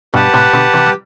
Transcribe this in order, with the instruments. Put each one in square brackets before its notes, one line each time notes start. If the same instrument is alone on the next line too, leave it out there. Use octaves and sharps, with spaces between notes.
[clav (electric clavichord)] G2 B2 [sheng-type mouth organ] G4 B4 F#5 A5
[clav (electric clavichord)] A2 C3
B2 D3
C3 E3
G3